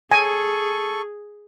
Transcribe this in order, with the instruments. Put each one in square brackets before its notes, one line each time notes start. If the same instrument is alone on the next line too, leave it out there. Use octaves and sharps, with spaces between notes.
[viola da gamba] G#4 [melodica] A4 C#6 [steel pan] G#5